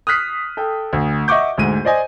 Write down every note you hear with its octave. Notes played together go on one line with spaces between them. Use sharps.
D#6 F6 F#6 B6 C7
A4 G5
D2
D#5 E5 F#5 C#6 D6 G6
D2 G#2 D#7
C5 D5 D#5 G#5